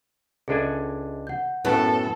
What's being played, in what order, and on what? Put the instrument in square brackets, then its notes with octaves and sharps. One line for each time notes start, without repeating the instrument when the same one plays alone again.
[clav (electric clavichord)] C#2 D4 G#5 [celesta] G#4 A4 E5
[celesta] F#5 G6
[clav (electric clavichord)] F#2 A2 [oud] B3 [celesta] E4 [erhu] A4